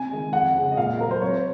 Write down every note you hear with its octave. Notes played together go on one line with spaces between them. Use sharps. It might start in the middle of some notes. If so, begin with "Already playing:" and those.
Already playing: C3 G#5
D#3 G#3
F2 F#5
C#3 G#3
D#5
A#2 F5
F#3 A#4
C5
C3 C#5